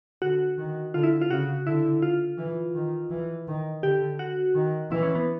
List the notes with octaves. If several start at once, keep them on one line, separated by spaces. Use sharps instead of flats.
D3 F#4
D#3
D3 F4
E4
F4
C#3 F#4
D3 E4
F4
E3
D#3
E3
D#3
D3 G4
F#4
D#3
E3 E4
C#4
B3